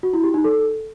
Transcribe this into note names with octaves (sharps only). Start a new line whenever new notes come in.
F#4
E4
G4
D#4
A4